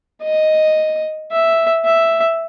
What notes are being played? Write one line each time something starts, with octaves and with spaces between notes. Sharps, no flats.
D#5
E5
E5